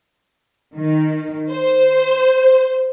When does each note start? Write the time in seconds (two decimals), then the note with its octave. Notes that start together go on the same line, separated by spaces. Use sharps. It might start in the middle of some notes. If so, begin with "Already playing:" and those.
0.75 D#3
1.51 C5